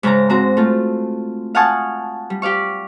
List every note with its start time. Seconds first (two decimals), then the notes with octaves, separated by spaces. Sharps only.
0.03 G#2 C#3 C#4 A#5
0.29 C4 F#4 A#5
0.57 A3 F4
1.55 F5 F#5 G#5 A5 C#6 D#6
2.30 G3
2.42 G4 D5 F5 C#6